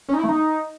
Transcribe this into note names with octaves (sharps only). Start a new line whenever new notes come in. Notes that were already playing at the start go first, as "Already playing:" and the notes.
C#4
D#4
E4
A3
D#4